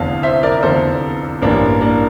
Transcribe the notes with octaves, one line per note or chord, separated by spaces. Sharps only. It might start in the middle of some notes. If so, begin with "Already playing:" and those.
Already playing: F1 E2 D3 F5 A5
C5 E5
A#4 D5
F1 E2 D3 A4 C5
A1 G2 E3 A#3 D4
A#3 D4